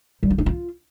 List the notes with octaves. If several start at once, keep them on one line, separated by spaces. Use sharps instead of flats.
G3
F4
D#4
F4